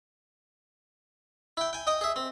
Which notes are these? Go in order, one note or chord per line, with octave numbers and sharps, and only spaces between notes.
E4 G5
G5 G#5
D#5 G5 D#6
G#4 E5
C4